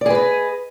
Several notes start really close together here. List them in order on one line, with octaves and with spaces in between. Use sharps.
D5 G#4 B4 D#5